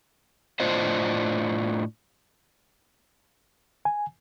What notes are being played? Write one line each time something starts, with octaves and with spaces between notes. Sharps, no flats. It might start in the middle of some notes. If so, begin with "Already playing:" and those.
A2 D4 F4 C5 D#5
G#5